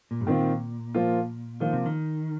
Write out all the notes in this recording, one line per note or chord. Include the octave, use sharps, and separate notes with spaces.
A#2
G2
A#2 D#3 C4 F4
F3 A#3 F4
D#3 F3 A#3 F4
C3
D#3